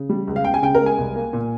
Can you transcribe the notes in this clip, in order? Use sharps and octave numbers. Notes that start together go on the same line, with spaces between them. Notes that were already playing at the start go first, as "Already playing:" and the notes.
Already playing: C#3
G3
C#2
F5
C#2 G5
G#5
C#3 G5
A#4
G#3
G#5
C2
A#3
A#2